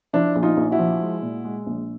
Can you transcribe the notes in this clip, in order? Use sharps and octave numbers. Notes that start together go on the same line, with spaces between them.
F3 D4 E4
A#1
D#4 F4
A#1
E4 F#4
F3
G#3
A#2
G#3
A#1